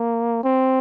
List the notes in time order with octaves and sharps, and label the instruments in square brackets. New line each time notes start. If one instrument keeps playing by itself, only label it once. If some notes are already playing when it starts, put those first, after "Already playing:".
Already playing: [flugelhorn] A#3
C4